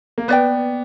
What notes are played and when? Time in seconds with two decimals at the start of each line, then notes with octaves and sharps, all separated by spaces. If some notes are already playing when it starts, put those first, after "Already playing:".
0.18 A#3
0.28 B3 B4 D5 G5